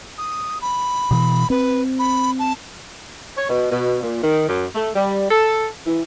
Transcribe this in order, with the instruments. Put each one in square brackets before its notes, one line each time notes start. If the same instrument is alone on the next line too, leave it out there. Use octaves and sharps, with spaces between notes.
[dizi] D#6
B5
[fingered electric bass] B2 E3
[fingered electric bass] C4 [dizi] B4
[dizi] B5
A5
[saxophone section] C#5
B2
B2
A#2
D#3
F#2
A3
G3
A4
E3